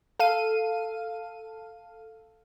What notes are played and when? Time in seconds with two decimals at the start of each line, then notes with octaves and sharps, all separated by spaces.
0.19 A4 F5 D#7